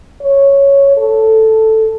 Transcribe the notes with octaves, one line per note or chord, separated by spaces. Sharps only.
C#5
A4